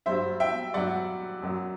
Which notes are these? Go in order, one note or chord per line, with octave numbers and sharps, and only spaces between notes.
G2 F#3 C5 E5
E5 G5
G2 F#3 D5 F#5
F#2 F#3